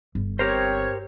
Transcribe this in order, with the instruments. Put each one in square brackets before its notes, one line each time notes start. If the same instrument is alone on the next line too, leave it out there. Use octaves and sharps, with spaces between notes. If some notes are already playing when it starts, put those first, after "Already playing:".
[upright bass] G1
[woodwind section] C4 C#5 [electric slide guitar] G4 A#4 C5